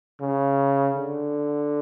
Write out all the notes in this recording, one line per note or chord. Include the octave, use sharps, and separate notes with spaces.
C#3
D3